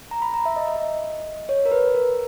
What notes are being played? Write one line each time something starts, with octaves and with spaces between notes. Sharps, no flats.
A#5
B5
A#5
E5
D#5
E5
D#5
C#5
A#4
B4
A#4